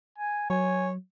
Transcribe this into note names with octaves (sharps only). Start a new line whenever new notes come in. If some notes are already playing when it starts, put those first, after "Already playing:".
G#5
F#3 C#5 G#5